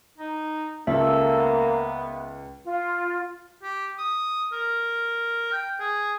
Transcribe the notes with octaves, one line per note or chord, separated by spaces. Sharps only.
D#4
C#2 A#3 A4 E5
B3
F4
G4
D#6
A#4
G5
G#4